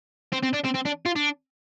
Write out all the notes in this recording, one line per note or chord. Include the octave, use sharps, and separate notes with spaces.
C4
C4
D4
C4
C4
D4
F4
D4